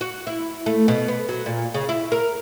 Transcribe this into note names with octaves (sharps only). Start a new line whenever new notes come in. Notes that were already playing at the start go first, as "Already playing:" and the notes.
F#4
E4
A3
B2
B3
F#3
A#2
C#3
E4
A#4